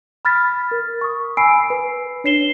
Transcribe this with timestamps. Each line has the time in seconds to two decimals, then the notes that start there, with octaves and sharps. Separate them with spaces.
0.25 B5 F6 A6 B6
0.71 A#4
1.01 C#6 D#6
1.37 G#5 B5 E6 C7 D7
1.70 B4
2.24 D4 C#5 C7 E7 G7